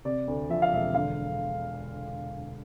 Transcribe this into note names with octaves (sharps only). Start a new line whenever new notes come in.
C3 D5
D2
F3 E5
F5
E1 E5
D3 F5